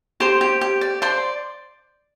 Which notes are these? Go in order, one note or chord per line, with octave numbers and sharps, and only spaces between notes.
G4 C5 C6
G4
G4
D5
C5 D5 C6